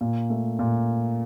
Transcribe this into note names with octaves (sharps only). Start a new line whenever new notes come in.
A#2
A3
A#2